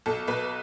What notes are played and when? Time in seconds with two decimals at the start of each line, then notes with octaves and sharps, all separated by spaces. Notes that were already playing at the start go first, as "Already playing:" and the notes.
0.06 B1 A4
0.28 B1 B4